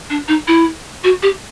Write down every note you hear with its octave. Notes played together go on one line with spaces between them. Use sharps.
D4
D#4
E4
F#4
G4